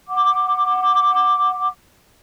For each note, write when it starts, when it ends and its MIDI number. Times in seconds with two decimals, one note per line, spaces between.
0.09 1.68 78
0.09 1.68 86